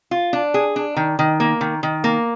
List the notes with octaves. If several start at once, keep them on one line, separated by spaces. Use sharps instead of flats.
F4
D4
G#4
D4
D#3
D#3
A#3
D#3
D#3
A#3